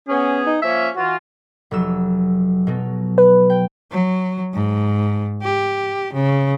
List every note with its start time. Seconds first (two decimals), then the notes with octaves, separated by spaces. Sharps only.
0.08 B3 C#4 G#4
0.46 D#4
0.62 F3 A#3 C#4 E5
0.96 E3 F4 F#4
1.71 F1 F#3 E6
2.67 B2 F#3
3.18 B4
3.50 G5
3.91 F#3
4.53 G#2
5.42 G4
6.13 C#3